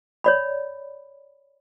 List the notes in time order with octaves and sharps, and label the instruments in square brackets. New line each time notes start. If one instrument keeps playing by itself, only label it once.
[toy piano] C#5 D5 B5